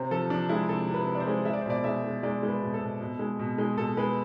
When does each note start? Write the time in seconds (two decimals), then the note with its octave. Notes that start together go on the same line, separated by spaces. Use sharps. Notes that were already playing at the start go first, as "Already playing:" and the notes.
Already playing: C3 C5
0.11 F3 A4
0.30 F3 D4
0.49 G#3 E4
0.69 C3 A4
0.88 C3
0.94 B4
1.07 C3
1.15 D5
1.20 C5
1.27 G#3
1.45 G#3 E5
1.53 D5
1.61 C5
1.66 B2 D5
1.84 G#3 E5
2.04 G#3
2.23 G#3 D5
2.43 G#3
2.48 B4
2.61 B2
2.74 A4
2.81 B2
3.01 B2
3.19 G#3
3.39 B2
3.58 G#3
3.77 B2 A4
3.97 G#3 B4